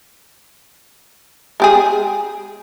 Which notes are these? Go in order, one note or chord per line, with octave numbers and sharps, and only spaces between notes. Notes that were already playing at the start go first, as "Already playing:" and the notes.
G#3 G4 G#4